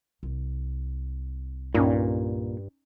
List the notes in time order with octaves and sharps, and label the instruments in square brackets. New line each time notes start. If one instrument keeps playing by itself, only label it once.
[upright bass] C2
[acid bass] G2 [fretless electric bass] A#2 [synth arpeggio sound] C#4 D#4